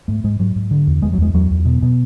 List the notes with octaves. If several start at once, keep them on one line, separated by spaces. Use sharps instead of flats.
G#2 A3
G#2 G#3
G#2 F#3
G#2
D3
E2
E2 G#3
F#3
E2 G#3
E2 F#3
E2
B2
B2